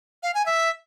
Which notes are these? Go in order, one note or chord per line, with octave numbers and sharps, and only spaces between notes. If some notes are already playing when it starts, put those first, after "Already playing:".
F5
G#5
E5